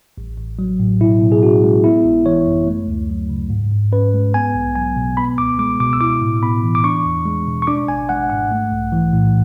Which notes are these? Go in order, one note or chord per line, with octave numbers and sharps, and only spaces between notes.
A1
A1
F#3
A2
B2 E4
B2
G#4
C#4 F#4
G#3
B3 E4
G#1
E3 C#5
F#2
A3
D2
F#3
C#3
G#2
G#2
C#4 B4
G#3
B3 G#5
B1
F#3 G#5
B2
B3 B5
C#2 D6
G#3 D6
B2 D6
E6
E4 D6
A2
B3 B5
E3
D6
D4 C#6
E2
G#3
B2
C#6
D4 D6
G#1 G#5
G#3 F#5
G#2 F#5
A3
B1
E3
A2